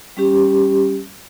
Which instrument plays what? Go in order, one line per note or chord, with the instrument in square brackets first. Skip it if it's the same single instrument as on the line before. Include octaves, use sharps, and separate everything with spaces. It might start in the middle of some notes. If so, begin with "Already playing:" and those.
[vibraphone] G3 C#4 G4